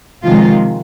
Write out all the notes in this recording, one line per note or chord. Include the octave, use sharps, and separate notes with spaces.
C3 D#3 F3 G#3 F4